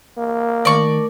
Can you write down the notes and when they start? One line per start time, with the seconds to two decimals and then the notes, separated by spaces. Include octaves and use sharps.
0.17 A#3
0.65 D#3 A3 A#4 D5 C#6